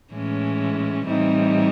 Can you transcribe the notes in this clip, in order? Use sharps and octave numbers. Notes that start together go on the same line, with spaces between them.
A2 E3 G#3 C#4
A2 E3 G3 C4 D#4